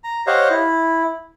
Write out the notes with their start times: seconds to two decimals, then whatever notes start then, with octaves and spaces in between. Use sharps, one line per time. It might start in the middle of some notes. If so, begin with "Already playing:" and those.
0.04 A#5
0.27 G4 C5 C#5 D#5 F5 F#5
0.51 E4